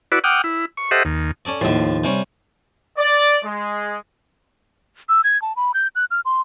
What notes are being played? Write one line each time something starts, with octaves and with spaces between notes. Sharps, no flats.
E4 F#4 B4 D5
F#5 G5 D6 D#6 F6
E4
C#6
G4 A4 C5 D#5 E5 F#5
D#2
C#4 A4 D5
D#2 A2 F3 E5
C3 G3 C#4
D5
G#3
E6
G#6
A5
B5
G6
F#6
F6
C6